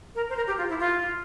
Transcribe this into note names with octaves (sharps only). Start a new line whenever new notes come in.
A#4
C5
A#4
G4
F4
E4
F4